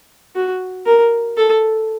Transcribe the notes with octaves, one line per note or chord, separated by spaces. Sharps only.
F#4
A#4
A4